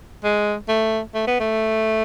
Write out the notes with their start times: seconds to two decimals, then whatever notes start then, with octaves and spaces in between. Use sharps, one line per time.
0.24 G#3
0.69 A3
1.15 A3
1.27 B3
1.40 A3